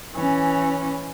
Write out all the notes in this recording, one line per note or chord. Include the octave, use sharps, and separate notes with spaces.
E3 C#4